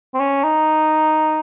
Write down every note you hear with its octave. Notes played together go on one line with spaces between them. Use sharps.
C4
C#4
D#4